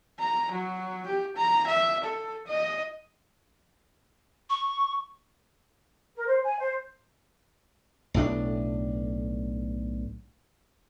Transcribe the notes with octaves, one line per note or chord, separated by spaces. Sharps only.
A#5
F#3
G4
A#5
E5
A4
D#5
C#6
A#4
C5
G#5
C5
B1 A2 E3 D4